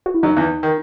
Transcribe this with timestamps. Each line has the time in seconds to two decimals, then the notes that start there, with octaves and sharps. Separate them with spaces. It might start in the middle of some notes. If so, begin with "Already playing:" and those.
0.06 F#4
0.14 E4
0.23 F#2 F#3 D#4
0.37 E2 E3
0.63 D#3